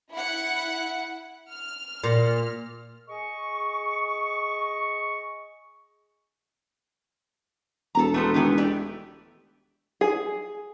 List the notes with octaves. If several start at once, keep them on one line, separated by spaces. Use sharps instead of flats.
E4 F#5
F6
A#2
G#4 D#5 C#6
E1 A4 A#5
E1 A3 B3 C5
D#3 E3 B3
A3 G4 D5
G#4